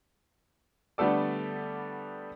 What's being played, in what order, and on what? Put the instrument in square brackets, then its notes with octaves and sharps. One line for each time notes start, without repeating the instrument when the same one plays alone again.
[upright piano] D3 G3 A3 B3 A4 D5